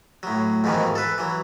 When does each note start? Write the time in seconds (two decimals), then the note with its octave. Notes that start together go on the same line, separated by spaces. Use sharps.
0.23 A2 F#3
0.64 F2 G#2 B2 D#3 E3
0.95 A4 B4
1.18 E3 F#3